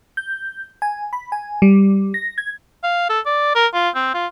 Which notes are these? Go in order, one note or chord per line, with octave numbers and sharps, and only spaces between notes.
G6
G#5
B5
G#5
G3
A#6
G#6
F5
A4
D5
A#4
F4
C4
F4